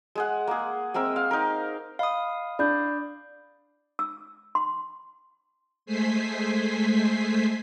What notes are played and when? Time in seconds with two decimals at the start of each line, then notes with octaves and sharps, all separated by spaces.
0.15 G#3 G#4 F#5
0.47 A#3 G#4
0.94 G#3 C4 A#4 E5
1.16 F5
1.31 D#4 A#4
1.99 D#5 F5 B5 D#6
2.59 D4 B5 G6
3.99 E6
4.55 C6
5.86 G#3 A3 C5 G#5 B6 C7